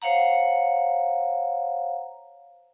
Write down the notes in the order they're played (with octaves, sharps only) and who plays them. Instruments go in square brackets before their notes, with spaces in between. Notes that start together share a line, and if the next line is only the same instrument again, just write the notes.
[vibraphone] C5 C#5 F5 F#5 A#5